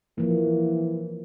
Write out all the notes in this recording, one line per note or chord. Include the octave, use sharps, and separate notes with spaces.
E3 F3 A#3